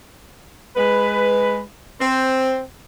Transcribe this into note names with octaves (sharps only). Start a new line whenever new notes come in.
G#3 B4
C4 C5